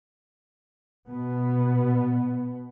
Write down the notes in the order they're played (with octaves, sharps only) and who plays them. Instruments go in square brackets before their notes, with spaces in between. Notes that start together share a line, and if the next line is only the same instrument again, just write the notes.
[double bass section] B2 B3